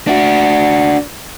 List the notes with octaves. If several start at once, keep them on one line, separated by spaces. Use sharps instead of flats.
D4 F#4